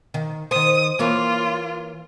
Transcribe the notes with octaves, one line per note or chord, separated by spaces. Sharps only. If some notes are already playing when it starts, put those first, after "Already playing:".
D#3
D#3 C5 D#6
E3 A#3 F4 C#5